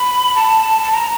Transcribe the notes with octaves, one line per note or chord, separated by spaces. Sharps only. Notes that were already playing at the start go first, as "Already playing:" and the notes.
Already playing: B5
A5
A5
A#5